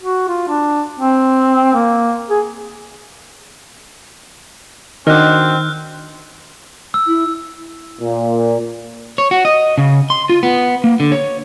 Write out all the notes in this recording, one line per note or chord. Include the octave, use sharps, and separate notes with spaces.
F#4
F4
D4
C4
A#3
G#4
D#3 C4 D4 F#4 D#5 F6 F#6
E6
E4
A#2
C#5
F#4
D#5
C#3
C6
F4
B3
A#3
D3
C#5